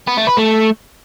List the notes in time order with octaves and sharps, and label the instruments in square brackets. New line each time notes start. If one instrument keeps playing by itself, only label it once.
[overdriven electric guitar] B3
A3
B4
A3